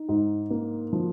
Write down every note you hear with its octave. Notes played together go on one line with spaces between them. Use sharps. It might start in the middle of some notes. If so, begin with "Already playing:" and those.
Already playing: D#4
G#2
A#3
F3